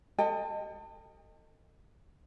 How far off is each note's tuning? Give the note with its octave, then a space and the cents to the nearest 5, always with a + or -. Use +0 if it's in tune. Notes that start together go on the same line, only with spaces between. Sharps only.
A4 +35 D#5 +0 G5 +40